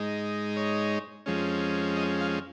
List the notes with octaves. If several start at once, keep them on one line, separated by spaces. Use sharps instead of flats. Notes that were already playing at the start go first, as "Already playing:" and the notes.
Already playing: G#2 G#3 D#4
C#5
F2 F3 G#3 C#4
D#5
F5